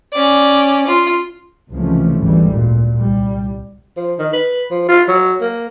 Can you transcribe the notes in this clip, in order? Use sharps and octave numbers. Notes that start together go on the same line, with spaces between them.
C#4 D5
F4
C#2 C3 E3 F3 A3 C#4
G#1 D2 E3 G3 G#3
A#2
C2 G3
F3
D#3
B4
F3
F4
F#3
A#3